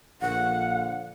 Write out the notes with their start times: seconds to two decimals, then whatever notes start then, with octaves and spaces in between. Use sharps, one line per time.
0.21 A#1 D3 F5 F#5